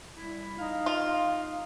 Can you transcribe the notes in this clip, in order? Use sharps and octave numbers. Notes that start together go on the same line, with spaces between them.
G3 E4
D#4 D#5 F5
F4